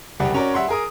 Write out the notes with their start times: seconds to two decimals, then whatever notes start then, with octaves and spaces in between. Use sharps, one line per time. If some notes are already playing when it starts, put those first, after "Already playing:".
0.20 F#1 C2 G3 G4 F#5
0.34 C#4 F#4 A#4 C#5 D5
0.54 G3 E5 F#5 C6
0.68 G#4 A#4 D#6